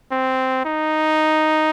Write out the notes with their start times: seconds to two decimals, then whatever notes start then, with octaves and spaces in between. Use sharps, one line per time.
0.12 C4
0.65 D#4